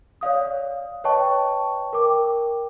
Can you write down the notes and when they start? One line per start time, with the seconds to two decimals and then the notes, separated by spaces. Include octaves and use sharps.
0.21 C#5 D5 F5 D#6
1.04 B4 C#5 D#5 G5 A5 C#6
1.93 A#4 G5 D6